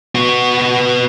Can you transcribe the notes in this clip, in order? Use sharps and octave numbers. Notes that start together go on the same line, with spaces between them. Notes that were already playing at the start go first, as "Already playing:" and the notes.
B3 F#4